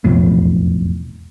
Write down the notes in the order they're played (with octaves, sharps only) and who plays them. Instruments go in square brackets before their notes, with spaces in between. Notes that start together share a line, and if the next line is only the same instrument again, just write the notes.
[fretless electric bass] E1 B1 F2 A2